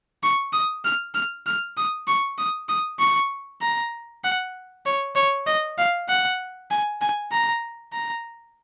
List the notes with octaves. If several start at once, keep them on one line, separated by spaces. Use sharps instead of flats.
C#6
D#6
F6
F6
F6
D#6
C#6
D#6
D#6
C#6
A#5
F#5
C#5
C#5
D#5
F5
F#5
G#5
G#5
A#5
A#5